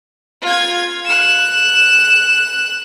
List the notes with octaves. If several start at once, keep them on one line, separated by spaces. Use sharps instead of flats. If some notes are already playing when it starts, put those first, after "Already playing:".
F4 G#6
F#6 E7